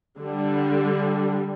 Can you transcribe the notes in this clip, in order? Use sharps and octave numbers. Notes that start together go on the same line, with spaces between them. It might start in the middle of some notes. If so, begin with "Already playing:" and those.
D3 G3